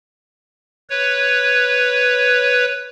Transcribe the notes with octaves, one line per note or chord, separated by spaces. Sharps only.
B4 C#5